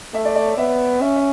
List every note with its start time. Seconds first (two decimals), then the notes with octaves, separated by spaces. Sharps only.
0.14 A3 E5
0.25 D5
0.36 D5
0.46 C#5
0.57 B3 E5
1.01 C#4 E5
1.16 E5